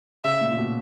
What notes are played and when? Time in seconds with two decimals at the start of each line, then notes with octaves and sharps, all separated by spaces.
0.24 C#3 E5
0.41 A#2
0.51 A#2
0.58 B2